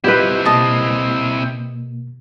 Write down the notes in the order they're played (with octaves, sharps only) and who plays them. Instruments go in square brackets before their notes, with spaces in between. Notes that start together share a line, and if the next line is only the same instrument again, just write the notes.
[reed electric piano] B3 F4 D#5 [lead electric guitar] C4 E4 [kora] G4 B4
[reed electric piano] B2 A#3 [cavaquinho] D#5 A5